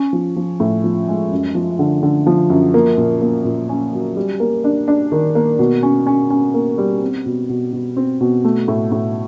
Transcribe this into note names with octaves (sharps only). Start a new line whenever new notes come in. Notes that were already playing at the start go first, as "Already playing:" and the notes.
Already playing: C#4
F3
F3
A2
F3
G#3
F#2
F3
D3
D3
F3
F#2
A#3
A#2
A#3
A#2
C#4
F#3
G3
A#3
D4
D4
D#3
A#3
B2
C#4
C#4
C#4
A#3
G3
C4
B2
B2
B2
C4
B2
A3
A2
A2